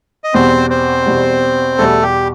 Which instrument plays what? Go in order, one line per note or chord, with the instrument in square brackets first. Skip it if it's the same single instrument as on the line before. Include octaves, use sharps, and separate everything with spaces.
[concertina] D#5
[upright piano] E2 B2 G3 [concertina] C4 C5
[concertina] C4 C5
[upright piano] E2 B2 G3
[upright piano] E2 B2 G3 [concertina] A3 A4
[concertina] G4